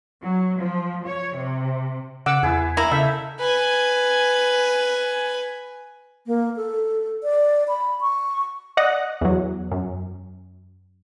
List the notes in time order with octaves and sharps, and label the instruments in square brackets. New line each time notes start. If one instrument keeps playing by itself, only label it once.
[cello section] F#3
F3
C#5
C3
[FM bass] C#3 [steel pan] F#5 D6 E6
[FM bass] E2 [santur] B3 E4 G#4
[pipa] A#3 E4 [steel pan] A#5
[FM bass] C#3 [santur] D#4 A4 [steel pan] E5
[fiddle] B4 G#5
[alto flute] A#3
A4
D5
B5
C#6
[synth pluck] D5 D#5 F#5 D#6 F#6 A#6
E2 F#3
F#2